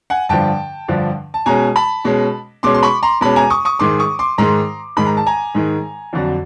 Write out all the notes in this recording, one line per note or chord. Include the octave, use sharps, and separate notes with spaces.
F#5 G#5
G2 D3 F3 G5 A5
G2 D3 F3
A5
B2 G#3 C#4 G#5 A#5
A5 B5
B2 G#3 C#4
B2 G#3 C#4 C6 D6
C6
B5 C#6
A#5 C6
B2 G#3 C#4 A5 B5
G#5 A#5
C#6 D#6
C#6 D#6
G#2 D#3 G#3 C6 D6
C#6 D#6
C6 D6
G#2 D#3 G#3 A#5 C6
G#2 D#3 G#3 B5
A#5
A5
G#5 A#5
G#2 D#3 G#3
F2 D3 F#3